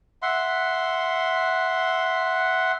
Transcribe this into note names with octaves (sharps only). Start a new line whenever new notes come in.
E5 F#5 C6